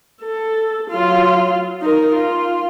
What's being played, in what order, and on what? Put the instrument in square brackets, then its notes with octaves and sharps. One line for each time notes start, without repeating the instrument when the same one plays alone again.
[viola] A4
F#3 F4
D#4 A#4
F4